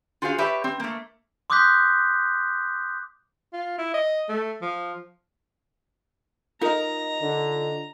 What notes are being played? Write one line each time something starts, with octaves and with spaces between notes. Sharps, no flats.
F4 F#4 G#4 C5 E5 F5
G4 B4 C#5 D5 E5
C4
A3 A#3
C6 D6 D#6 F#6 G6 B6
F4
E4
D#5
A3
F3
D#4 F4 A#4 D#5 A#5
D3